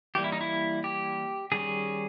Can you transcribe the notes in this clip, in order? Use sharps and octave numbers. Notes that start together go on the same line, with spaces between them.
E3 G3 A#3 G4
E4
D#4
E4
G4
D#3 G3 C#4 G#4